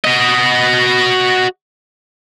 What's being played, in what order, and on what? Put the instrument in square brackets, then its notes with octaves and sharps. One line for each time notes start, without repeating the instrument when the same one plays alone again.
[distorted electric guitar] F#4 D#5